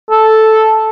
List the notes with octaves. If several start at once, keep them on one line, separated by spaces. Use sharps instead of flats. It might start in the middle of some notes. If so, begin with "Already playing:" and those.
A4